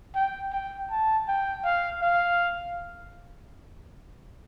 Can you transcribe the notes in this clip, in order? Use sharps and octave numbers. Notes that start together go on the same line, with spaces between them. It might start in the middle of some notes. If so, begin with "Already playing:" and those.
G5
G5
A5
G5
F5
F5